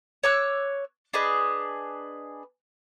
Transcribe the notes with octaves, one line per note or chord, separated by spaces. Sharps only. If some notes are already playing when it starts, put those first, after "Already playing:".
C#5 D6 E6 F#6
D4 G#4 B4 D#5